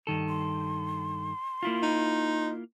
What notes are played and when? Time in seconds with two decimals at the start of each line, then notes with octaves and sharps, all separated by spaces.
0.07 G2 D#3 A4
0.29 C6
1.63 A#3 E4 F4
1.82 D#4